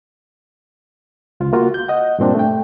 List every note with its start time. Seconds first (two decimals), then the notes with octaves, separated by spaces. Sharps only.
1.40 C#2 F4
1.53 A#3 F4 F#4
1.74 G6
1.88 D#5 F#5
2.19 G2 A#2 C4 D4
2.35 A3 G5